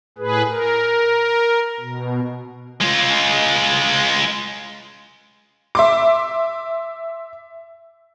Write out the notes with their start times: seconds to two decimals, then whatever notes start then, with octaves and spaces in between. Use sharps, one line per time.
0.18 A2 G#4 B4
0.49 A#4
1.80 B2
2.81 G#3 F4
5.75 E5 C6 D6